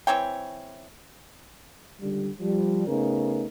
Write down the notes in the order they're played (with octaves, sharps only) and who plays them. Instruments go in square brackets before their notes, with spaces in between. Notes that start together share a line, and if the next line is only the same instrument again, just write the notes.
[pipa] E3 C4 C#5 G5
[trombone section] C#2 D3 G3
F3 G3
C#3 A3 B3 D#4 A#4